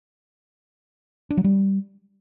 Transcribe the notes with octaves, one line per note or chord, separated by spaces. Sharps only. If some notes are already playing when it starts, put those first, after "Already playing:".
D4
F#3
G3